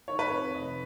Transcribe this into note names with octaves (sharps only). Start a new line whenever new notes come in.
D#3 C#5
B4
F2 C#5
F1 D#5